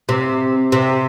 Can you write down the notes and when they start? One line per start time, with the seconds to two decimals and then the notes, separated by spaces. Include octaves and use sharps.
0.09 C3
0.72 C3